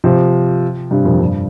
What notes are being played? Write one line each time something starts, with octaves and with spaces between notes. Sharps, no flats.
C3 F3
G2 C3
F2 A#2
G2